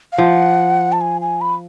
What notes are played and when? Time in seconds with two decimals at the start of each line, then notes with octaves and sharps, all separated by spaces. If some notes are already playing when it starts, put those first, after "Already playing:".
0.13 F5
0.18 F3 F#5
0.92 A5
1.01 G#5
1.21 G#5
1.41 B5